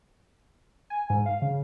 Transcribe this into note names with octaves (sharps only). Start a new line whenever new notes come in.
G#5
G#2
F5
C#3